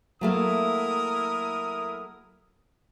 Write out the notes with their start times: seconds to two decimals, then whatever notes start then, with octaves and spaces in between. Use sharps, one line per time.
0.21 F#3 A3 A#3 E4 A#4 D#6